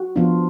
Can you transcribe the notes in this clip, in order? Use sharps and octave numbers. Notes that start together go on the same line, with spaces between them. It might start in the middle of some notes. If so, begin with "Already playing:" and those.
Already playing: F#4
F3 B3 D4 F4